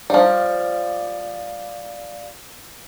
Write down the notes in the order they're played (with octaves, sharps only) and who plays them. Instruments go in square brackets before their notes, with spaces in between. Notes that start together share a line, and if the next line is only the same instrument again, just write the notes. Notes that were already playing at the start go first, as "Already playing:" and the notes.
[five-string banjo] F3 G3 [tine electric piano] D5 F5